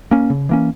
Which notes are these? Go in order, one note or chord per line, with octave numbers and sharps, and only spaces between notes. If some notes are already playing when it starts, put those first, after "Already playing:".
A#3 C#4
C#3
E3 A#3 C#4